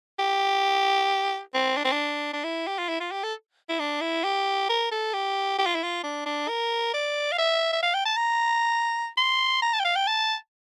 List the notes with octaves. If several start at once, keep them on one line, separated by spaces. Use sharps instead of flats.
G4
C4
D4
C4
D4
D4
E4
G4
F4
E4
F4
G4
A4
E4
D4
E4
G4
A#4
A4
G4
G4
F4
E4
F4
D4
D4
A#4
D5
F5
E5
E5
F5
G5
A5
A#5
C6
A#5
A5
G5
F5
G5
A5